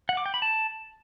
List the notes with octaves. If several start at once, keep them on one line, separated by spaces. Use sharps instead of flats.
F#5
D6
G5
B5
A5